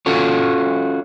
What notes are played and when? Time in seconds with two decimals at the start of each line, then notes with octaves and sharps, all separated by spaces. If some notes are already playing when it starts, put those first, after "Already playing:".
0.06 C#4 F4 F#4 A4 C#5